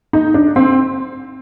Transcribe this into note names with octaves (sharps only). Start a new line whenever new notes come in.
D#4
D4
C4